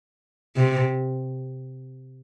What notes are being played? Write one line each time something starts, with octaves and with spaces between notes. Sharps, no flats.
C3